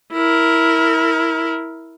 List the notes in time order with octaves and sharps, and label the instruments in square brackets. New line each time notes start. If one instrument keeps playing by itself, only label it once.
[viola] E4 A#4